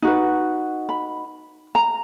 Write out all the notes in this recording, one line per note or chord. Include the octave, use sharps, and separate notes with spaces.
D#4 F#4 B4
B5
A#5